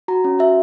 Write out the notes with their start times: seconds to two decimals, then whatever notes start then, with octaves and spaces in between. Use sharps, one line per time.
0.08 F#4 A#5
0.24 C#4
0.39 F#4 E5